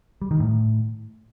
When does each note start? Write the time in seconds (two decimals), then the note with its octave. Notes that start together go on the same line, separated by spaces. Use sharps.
0.22 G3
0.31 D#3
0.40 A2